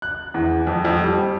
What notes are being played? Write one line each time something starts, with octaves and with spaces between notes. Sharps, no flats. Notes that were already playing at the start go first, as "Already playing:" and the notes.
F#6
E2
F2
F2
G3